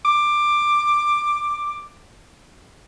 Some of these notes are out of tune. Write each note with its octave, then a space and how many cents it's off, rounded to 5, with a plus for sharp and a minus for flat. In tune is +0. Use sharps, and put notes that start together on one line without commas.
D6 +15